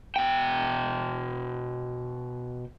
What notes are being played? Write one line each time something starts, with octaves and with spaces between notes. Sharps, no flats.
B2 G5